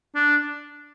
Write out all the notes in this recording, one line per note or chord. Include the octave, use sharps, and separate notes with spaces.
D4